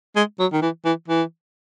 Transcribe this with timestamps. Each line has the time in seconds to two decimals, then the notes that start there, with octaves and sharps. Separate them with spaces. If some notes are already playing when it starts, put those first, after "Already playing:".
0.16 G#3
0.39 F#3
0.53 D#3
0.62 E3
0.85 E3
1.08 E3